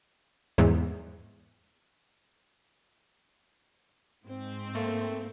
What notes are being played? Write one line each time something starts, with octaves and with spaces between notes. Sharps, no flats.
E2 G#2
G#2 C4
A3 A#3